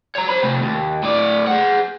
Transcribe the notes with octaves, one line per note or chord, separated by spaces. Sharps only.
C#5 A#5
C5 B5
C3 A3
D#2
A2 D5
G#4 F#5